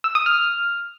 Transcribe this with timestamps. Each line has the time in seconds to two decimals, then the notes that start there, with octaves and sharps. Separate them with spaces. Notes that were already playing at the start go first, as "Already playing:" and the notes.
0.04 E6
0.15 D#6
0.26 F6